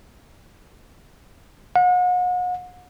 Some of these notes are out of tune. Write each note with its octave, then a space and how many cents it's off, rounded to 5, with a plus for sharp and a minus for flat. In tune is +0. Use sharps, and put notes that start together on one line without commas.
F#5 -40